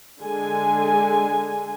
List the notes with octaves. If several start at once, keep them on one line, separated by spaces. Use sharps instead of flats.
D3 G#3 G#5